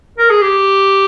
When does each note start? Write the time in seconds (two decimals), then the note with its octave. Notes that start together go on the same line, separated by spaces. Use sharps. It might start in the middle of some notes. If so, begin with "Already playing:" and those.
0.18 A#4
0.30 G#4
0.42 G4